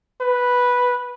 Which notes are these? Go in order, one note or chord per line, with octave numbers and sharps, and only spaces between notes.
B4